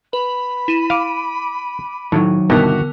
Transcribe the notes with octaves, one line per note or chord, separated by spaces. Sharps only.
B4 B5
E4 D#7 E7
F5 D6 D7 D#7
A2 D#3 F3 F#3
C2 G2 B2 D3 D#3 B3 F#4 A#4